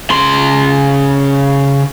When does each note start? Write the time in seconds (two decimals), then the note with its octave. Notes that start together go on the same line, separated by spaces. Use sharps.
0.10 C#3 C6